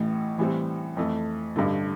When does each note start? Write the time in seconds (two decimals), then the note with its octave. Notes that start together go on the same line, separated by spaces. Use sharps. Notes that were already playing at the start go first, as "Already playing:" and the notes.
Already playing: A1 A2 E3
0.38 A2 E3 G3 C4
0.97 F2 E3 A3
1.56 A1 G2 D3 A3